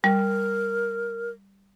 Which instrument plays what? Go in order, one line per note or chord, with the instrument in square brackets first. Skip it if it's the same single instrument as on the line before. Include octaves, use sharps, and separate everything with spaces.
[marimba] G3 [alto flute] A#4